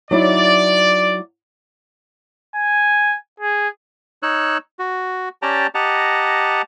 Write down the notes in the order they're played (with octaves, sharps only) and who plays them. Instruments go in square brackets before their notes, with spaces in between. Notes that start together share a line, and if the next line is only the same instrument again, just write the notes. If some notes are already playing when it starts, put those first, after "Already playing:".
[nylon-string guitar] F#3 D#4 E4 [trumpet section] D5
[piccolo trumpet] G#5
G#4
[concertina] D#4 C#5 E6 F#6
F#4
C#4 G4 D5 G5 A5 A#5
G4 D#5 F#5 A5 A#5